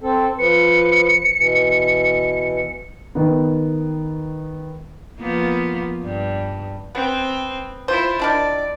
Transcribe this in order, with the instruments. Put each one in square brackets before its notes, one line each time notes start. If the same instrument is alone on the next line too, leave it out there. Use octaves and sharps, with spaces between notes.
[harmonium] C4 A4
[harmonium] F3 B4 [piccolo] C#7
[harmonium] B2 E3
[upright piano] D#3 B3
[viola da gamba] F3 A#3 B3
G2
[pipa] B3 [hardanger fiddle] C4
[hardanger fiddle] E4 F4 [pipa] C5
[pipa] D#3 D4 E4 [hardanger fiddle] D5